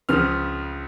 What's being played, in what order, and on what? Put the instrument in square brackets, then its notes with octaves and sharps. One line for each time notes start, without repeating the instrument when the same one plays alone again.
[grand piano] C#2 C#3 F3 F6